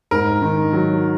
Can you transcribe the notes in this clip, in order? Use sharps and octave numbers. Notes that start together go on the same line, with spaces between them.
G#2 A#4
D#3
F#3